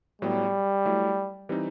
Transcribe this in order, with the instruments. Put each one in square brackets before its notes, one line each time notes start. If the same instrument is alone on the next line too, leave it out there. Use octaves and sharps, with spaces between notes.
[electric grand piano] A2 F#3 B3 [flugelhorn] G3
[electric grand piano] F#3 A3 E4
E3 G3 C4 D#4